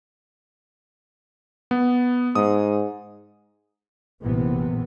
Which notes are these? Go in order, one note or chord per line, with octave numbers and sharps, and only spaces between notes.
B3
G#2 D#6
A#1 F#2 C3 E3 B3